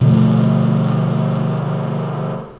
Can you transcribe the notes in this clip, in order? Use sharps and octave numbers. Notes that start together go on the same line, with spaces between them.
B2 D3 F3 A3